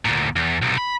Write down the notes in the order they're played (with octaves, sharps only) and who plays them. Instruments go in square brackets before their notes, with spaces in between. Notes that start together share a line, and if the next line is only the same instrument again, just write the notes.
[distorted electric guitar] D2 A#2
E2
B1 C3
B5